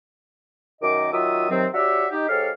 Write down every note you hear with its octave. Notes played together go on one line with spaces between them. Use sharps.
F#2 D#3 D#5 D6
D#3 F#3 F4 E5 D#6 E6
C3 D#3 F#3 C4
D4 F#4 G4 C#5 E5
D#4 G4
G#2 G4 A4 C#5 F5 F6